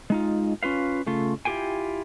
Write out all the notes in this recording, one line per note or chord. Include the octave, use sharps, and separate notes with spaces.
G#3 D#4 F4
C#4 F4 B4 F5
C#3 A3 F4
E4 F4 G4 G#4 G5 G#5